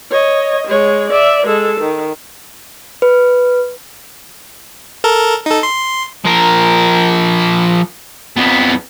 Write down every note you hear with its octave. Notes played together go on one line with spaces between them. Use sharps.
C#5 D#5
G#3 C#5
D5 E5
G#3 A4
D#3
B4
A4 A#4
D#4 A4
C6
F3 A#4
F2 B3